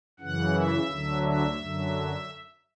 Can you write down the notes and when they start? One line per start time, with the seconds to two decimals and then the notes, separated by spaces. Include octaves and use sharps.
0.20 F#2 C#3 E3 F#5
0.54 E5
0.88 D2 D3 F#3
1.23 E5
1.57 F#2 D3 F#3